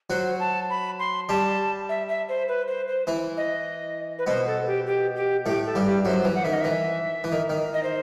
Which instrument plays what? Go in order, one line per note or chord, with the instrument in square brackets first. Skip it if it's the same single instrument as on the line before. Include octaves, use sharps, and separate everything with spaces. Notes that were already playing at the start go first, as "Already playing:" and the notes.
[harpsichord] F#3 F#4 [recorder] C5
[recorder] A5
B5
C6
[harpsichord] G3 G4 [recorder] A5
[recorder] E5
E5
C5
B4
C5
C5
[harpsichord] E3 E4
[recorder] D#5
B4
[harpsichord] B2 B3 [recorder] C5
[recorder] A4
G4
G4
G4
[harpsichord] A2 A3 [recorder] G4
[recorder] A4
[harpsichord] G2 G3
[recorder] G4
[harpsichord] F#2 F#3 [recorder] C5
[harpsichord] E3
[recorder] F#5
[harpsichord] D#3 [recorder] E5
[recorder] D#5
[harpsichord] E3 [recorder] E5
[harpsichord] E3
D#3
D#3
[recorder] D#5
C5